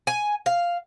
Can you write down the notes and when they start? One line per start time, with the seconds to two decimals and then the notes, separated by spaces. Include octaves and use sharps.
0.07 G#5
0.46 F5